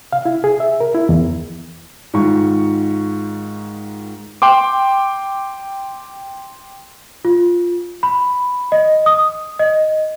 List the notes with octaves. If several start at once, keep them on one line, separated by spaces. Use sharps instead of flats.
F5
E4
G#4
E5
A#4
E4
E2
G#2 D#3 F4 C#6
G5 C6 D6
F4
B5
D#5
D#6
D#5